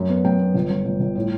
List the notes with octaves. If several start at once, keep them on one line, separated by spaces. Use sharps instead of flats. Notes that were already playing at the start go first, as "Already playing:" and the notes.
Already playing: F#2
B3
F#2 G5
B3
G1
G1
G1
G1
A2